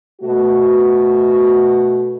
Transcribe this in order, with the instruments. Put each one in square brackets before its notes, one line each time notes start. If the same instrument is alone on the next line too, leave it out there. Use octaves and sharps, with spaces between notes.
[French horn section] B2 A3 F#4